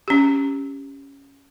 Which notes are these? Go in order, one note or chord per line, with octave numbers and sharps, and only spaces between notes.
C#4 G4